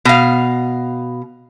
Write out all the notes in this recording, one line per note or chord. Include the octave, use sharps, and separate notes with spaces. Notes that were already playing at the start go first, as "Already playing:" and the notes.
B2 F5